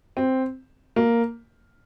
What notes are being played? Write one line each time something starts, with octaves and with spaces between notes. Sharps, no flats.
C4
A#3